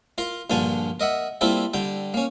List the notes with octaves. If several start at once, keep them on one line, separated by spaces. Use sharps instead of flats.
F4 A#4 F5
A#1 G2 D3 F4 G#5 A5
A#4 D#5 E5 F#5
G3 A#3 C4 E4 F4 A4
D3 G3 G5
A#3 C#4